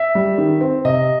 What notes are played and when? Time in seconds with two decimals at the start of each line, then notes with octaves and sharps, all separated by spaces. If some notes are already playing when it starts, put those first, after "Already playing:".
Already playing: E5
0.15 G3
0.38 D#3
0.61 C4
0.85 C3 D#5